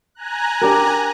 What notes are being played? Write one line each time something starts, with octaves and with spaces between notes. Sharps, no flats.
G#5 A#5 F#6
D4 G4 A#4